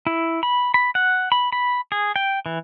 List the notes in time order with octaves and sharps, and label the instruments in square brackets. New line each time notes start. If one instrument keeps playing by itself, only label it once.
[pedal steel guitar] E4
B5
B5
F#5
B5
B5
G#4
G5
E3